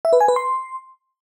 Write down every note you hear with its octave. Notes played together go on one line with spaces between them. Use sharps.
E5
B4
G#5
B4
C6